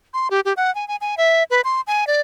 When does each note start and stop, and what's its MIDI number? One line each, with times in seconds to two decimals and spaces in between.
0.14 0.29 84
0.31 0.40 67
0.45 0.53 67
0.57 0.73 78
0.75 0.87 80
0.88 0.96 80
1.01 1.15 80
1.17 1.43 76
1.50 1.61 71
1.64 1.81 84
1.87 2.07 80
2.07 2.21 74